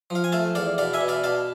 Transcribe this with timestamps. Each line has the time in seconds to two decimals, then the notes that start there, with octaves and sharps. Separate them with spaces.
0.10 F3 F5
0.24 G#5
0.32 A3 F5 A5
0.55 E2 D5 F5
0.78 B2 D5 F5
0.94 E5 G#5
1.01 B2
1.08 D5 F5
1.24 B2 F5 A5